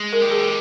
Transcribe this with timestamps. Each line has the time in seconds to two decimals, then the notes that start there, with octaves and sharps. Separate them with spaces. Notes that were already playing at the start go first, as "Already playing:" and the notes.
Already playing: G#3
0.13 A#4
0.22 G4
0.31 G#4